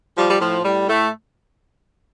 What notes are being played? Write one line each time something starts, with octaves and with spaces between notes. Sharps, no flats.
F3 G3
G3
A2 F3
A2 G3
A2 A3